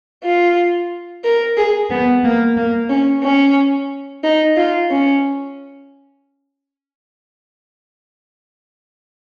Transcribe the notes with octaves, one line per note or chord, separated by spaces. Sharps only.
F4
A#4
G#4
B3
A#3
A#3
C#4
C#4
D#4
F4
C#4